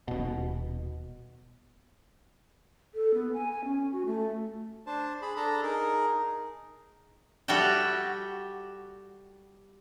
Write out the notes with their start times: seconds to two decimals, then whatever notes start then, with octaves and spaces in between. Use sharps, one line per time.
0.08 D#1 B2
2.95 A4
3.14 B3
3.33 G#5
3.52 G#5
3.64 C#4
3.92 F#4
4.06 A3
4.87 D4 C5 A5
5.22 G#4 B5
5.36 D4 A4 A5 A#5
5.63 D#4 G#4 A#4
7.48 G3 F#4 G4 A4 E5 G5